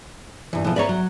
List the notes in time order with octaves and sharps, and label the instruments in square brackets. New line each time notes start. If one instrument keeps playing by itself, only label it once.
[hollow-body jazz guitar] G2 E3
[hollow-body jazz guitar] B1 F3 [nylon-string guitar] E3
[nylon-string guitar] B4 C#5 [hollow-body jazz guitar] D5 E5 A#5
[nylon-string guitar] F#3